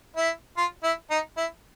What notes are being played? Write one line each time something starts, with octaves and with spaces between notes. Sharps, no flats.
E4
F4
E4
D#4
E4